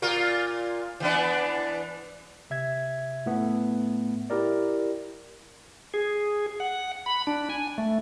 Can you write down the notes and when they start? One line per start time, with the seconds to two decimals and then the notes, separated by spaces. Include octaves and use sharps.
0.02 A#2 F4 A#4
1.00 E3 B3 D4
2.50 C3 E5 G#6
3.26 A2 A3 B3
4.30 E4 G4 A#4 D5
5.94 G#4
6.60 F#5
7.06 B5
7.27 D4
7.50 G#5
7.78 A3